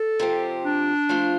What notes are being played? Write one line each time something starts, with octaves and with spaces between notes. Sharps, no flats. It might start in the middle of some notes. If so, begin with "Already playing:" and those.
Already playing: A4
F2 C3 F3 C4 G4
D4
F3 A3 F4 C5 F5